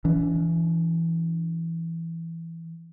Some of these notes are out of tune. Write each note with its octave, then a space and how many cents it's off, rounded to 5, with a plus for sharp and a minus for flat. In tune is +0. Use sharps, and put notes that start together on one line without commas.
E3 +10 D4 -45